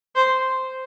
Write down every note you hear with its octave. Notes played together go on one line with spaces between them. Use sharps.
C5